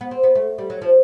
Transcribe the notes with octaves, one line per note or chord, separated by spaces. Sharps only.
B3
C4
B3
A3
G3
F#3
F3